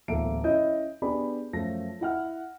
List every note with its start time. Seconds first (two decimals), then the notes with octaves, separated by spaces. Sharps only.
0.08 D1 E2 A#3 A4 E5 D7
0.44 C#4 E4 D#5 G6
1.02 B3 D4 G4 G#4 D5 B5
1.53 F#2 F3 A3 F4 A#6
2.01 E4 F#5 F6